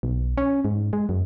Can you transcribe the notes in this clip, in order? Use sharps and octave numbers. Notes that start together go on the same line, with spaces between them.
B1
C#4
G#2
G#3
F#2